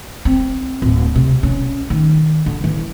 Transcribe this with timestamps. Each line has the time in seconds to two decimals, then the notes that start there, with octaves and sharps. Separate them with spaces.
0.25 C4
0.82 D1
1.16 C3
1.43 C#4
1.90 D#3
2.46 D3
2.64 E3